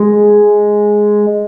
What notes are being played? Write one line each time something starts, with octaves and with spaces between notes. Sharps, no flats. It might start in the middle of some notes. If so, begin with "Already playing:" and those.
Already playing: G#3